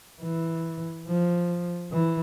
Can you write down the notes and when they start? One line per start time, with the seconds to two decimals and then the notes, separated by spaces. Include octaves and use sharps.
0.22 E3
1.07 F3
1.92 E3